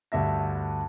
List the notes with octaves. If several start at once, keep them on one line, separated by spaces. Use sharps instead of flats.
D2 G2 E5 A#6